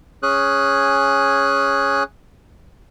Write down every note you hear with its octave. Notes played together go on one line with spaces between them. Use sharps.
C#4 G#4 F#6